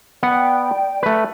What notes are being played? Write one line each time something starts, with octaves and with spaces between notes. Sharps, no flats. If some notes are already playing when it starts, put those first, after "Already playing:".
B3 D5 F#5 G5
A3 B4